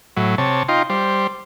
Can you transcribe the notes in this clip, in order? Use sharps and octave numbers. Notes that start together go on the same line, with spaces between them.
A2 F#3
C3 C#5 A5
D#4 F4 G5 C6
G3 C5